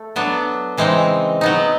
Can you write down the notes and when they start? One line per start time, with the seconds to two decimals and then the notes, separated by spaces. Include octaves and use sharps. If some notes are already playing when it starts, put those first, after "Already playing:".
Already playing: A3
0.16 F#3 B3 D4
0.77 C#3 E3 G#3 C4 D#4
1.41 F#3 B3 D#4